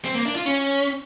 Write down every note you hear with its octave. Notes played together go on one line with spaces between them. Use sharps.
C4
A#3
D4
F4
C#4